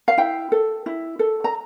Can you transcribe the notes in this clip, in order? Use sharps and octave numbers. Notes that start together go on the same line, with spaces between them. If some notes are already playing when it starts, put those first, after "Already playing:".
F5
E4 G5
A4
E4
A4
A#5